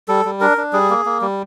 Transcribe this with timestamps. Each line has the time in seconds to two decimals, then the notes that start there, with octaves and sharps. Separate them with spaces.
0.08 G3 A4
0.25 G3
0.41 D4 A#4
0.57 D4
0.73 G3 G#4
0.90 A#3
1.06 A#3
1.21 G3